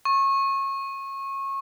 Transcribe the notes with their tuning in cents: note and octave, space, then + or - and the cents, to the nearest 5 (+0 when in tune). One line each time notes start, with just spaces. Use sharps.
C#6 -25